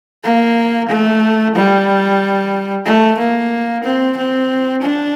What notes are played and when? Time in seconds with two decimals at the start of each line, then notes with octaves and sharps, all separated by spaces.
0.24 A#3
0.89 A3
1.55 G3
2.85 A3
3.18 A#3
3.84 C4
4.17 C4
4.82 D4